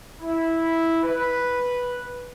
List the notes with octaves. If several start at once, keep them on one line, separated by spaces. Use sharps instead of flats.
E4
B4